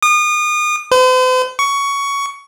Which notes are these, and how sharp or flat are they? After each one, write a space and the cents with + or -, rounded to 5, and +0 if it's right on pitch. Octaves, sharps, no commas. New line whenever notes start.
D#6 -35
C5 -45
C#6 +15